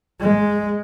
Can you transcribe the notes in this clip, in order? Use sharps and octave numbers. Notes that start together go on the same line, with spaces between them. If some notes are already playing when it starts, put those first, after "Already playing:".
G#3